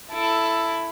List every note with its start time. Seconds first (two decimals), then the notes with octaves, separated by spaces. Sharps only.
0.12 E4 A4